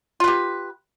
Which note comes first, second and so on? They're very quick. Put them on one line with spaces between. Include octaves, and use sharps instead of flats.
F4 B4 G4